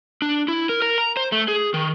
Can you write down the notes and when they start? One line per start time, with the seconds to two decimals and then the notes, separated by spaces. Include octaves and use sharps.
0.22 D4
0.48 E4
0.69 A#4
0.82 A#4
0.98 A#5
1.17 C5
1.32 A3
1.48 G#4
1.74 D#3